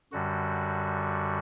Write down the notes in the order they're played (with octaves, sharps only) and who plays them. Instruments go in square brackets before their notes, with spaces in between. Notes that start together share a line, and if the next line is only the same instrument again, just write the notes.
[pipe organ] F#2 D3 G3 F#4